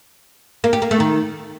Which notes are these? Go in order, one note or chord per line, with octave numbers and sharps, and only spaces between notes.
A#3
G4
A#3
A3
D#3